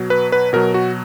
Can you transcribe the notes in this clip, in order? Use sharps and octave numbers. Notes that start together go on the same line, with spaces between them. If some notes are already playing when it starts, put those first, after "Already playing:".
Already playing: B2 F#3
B4
B4
B2 F#3 A#4
F#4